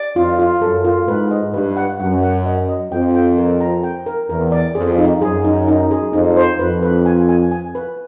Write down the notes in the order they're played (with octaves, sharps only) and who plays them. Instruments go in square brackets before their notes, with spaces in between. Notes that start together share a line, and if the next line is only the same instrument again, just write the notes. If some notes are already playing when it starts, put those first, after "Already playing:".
Already playing: [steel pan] D5
[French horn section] F2 [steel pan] F4
[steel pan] F4
[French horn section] F#2 [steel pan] A4
[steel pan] F4
[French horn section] G#2 [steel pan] B4
[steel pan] D#5
[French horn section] G2 [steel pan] B4
[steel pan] F#5
[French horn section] F#2 [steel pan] F#5
[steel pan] F#5
D#5
D#5
[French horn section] F2 [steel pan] G5
[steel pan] G5
A#4
A#5
G5
A#4
[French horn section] E2 [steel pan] A#4
[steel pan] D5
[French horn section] F2 [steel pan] G#4
[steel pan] D#4
[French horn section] F#2 [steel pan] G#4
[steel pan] D#4
D#4
G#4
[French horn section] F2 [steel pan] D#4
[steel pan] C5
[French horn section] F2 [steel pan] B4
[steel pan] B4
G#5
G#5
G#5
B4